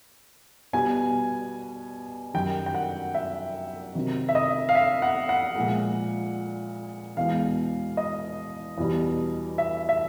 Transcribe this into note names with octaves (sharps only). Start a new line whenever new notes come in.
B2 G3 B3 G#5
F#2 D#3 G3 G5
G5
F#5
E5
C3 D#3 F#3
E5
D#5
F5
E5
F#5
F#5
A#2 F3 G#3
E2 B2 G#3 B3 F5
D#5
E2 B2 G3
E5
E5